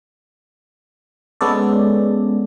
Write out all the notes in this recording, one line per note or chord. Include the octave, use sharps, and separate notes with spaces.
G#3 B3 C#4 A4 D5